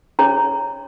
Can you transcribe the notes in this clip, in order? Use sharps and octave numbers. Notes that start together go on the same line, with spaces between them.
C#4 G#4 C#5 A#5